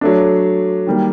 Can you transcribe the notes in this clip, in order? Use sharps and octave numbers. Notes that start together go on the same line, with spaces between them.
F#3 A3 D4
D#3 G3 A#3